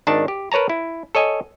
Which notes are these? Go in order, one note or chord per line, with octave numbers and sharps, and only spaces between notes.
G#1 D#3 D4 A5
G4
A#4 B4 C#5 A5 A#5
E4
A4 C#5 D#5 G#5